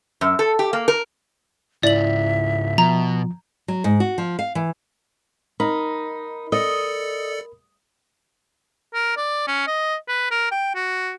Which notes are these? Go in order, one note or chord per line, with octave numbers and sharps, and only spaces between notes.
F#2
A4
G4
A#3
A#4
C#2 G#2 E4 D5 E5 F#7
B2 F3 A#5
F#3
G#2
F#4
F3
F5
E3
D#4 A#4 B5
A4 D5 D#5 C#7
A#4
D5
C#4
D#5
B4
A#4
G5
F#4